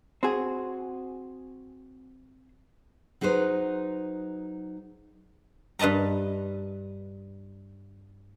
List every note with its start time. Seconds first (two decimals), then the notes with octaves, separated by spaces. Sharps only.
0.23 C4 F#4 G#4
3.21 F#3 D#4 G#4 B4 C5
5.79 G2 B4 D#5 A5 A#5